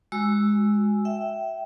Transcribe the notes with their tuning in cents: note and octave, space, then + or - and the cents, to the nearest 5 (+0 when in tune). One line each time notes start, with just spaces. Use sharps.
G#3 +0 F#4 +0 E6 +0
E5 +0 G5 -25